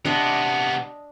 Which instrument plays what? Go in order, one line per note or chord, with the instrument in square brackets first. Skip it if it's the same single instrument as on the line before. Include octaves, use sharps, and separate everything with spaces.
[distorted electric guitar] C3 B3 [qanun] D4 D#5